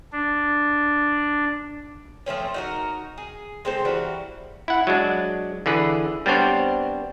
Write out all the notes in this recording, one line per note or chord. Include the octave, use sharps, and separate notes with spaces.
D4
F3 A3 C4 C#4
D#4 F#4 A#4
G#4
G#3 C4 A4 C5
E3 G3 F#4 A#4
E4 F#5
F#3 G#3 D4
D3 E3 G#4 B4
G3 B3 C4 D4 C5 C#5